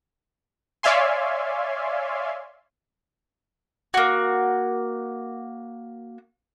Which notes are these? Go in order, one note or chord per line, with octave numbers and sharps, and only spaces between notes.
C#5 D5 E5 F5 G#5 C6
A#3 F#4